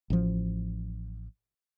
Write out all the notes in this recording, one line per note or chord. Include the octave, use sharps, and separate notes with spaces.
A1 F3